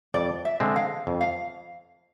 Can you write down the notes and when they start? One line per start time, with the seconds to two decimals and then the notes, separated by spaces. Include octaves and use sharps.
0.14 F2 D5
0.45 E5
0.60 D3 G#3 C4
0.76 F5
1.07 F2
1.21 F5